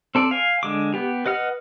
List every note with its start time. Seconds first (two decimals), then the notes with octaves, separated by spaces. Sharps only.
0.15 C4 A4 D5
0.31 F5 G#5
0.63 D3 G#3 D6
0.94 B3 G4
1.26 B4 D#5 F#5 F6